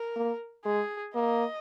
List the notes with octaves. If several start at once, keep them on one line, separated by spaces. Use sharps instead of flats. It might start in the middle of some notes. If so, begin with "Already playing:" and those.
Already playing: A#4
A#3
G#3 G#4
A#3 D#5